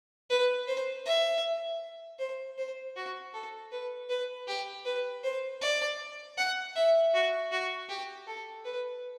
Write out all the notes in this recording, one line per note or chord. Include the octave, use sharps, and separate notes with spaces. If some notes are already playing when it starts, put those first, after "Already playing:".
B4
C5
E5
C5
C5
F#4
A4
B4
B4
G4
B4
C5
D5
F#5
E5
F#4
F#4
G4
A4
B4